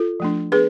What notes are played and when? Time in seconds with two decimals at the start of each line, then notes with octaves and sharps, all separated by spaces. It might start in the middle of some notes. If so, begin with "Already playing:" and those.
Already playing: F4 A4
0.20 F3 A3 D4
0.52 B3 D4 G#4 B4